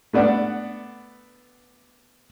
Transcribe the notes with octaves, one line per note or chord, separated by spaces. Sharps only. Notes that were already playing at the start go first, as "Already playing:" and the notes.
A3 B3 D4 D5 F#5